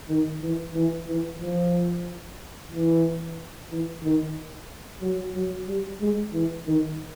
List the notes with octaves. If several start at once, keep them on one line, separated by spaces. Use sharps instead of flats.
D#3
E3
E3
E3
F3
E3
E3
D#3
F#3
F#3
G3
G#3
E3
D#3